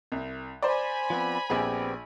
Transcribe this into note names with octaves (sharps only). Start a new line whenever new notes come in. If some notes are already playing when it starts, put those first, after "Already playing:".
C2
C5 D5 G#5 B5
F3 B3 C4
A#1 B3 C4 G4 G#4